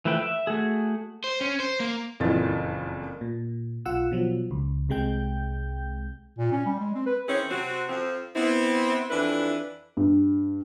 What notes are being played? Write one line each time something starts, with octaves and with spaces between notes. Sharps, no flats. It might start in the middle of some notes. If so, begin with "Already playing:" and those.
E3 F3 A3 B4 G5
E5
A3 F#4 G#4
C5
C#4
C5
A#3
F#1 F2 A#2 E3 A6
A#2
B1 F4 F#5 E6
B2 F3 F#3
C#2
C2 C3 G#3 G5 G6
A#2
C#4
G3
G#3
C4
B4
D#3 C4 C#4 E4 G#4 C#5
C3 C4 F#4
F2 F3 C4
B3 C4 E4
F2 E3 D4 E4 B4
G2